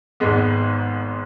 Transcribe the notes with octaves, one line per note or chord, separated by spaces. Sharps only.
G#1 G#2 G#3 B3